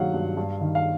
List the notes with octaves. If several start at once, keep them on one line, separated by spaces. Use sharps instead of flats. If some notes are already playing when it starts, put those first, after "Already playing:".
Already playing: G2 D#3 F#3 F5 F#5
G2
G2
D#3
F5